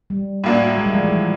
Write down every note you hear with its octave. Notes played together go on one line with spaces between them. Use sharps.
G3
A2 F#3 A#3 D4
G#3
G3
F3
E3
F3